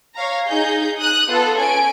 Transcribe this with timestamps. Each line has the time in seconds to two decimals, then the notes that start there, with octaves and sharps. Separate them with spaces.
0.15 C#5 F5 A#5
0.47 D#4 G#4 G6
0.98 D#6 F#6
1.29 B3 F4 A4
1.59 C#4 G#5 D7